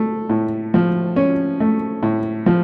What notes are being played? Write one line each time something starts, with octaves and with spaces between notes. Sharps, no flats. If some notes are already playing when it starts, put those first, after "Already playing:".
Already playing: A3
A2
F3
C#4
A3
A2
F3